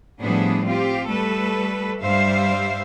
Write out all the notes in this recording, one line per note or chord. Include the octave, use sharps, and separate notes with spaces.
A2 F3 G3 B3 D4 G#4
C4 F4 G4
G3 A3 A4 B4
G2 G3 C5 E5 F5